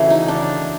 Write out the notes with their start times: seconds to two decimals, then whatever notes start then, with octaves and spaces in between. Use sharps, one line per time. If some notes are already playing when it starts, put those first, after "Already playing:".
Already playing: C#3 E3 A3 F#4
0.10 D#4
0.28 D4